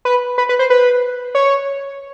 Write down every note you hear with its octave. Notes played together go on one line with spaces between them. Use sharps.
B4
B4
B4
C5
B4
C#5